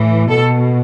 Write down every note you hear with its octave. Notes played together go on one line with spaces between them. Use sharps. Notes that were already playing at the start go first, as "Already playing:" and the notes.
Already playing: A2 E3
B2 A4